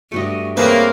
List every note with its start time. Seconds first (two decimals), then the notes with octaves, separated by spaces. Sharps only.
0.12 G2 A3 F#4 D#5
0.57 C#3 A#3 C4 B4 C5